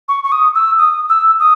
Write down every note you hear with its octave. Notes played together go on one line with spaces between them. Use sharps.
C#6
C#6
D#6
E6
D#6
E6
D#6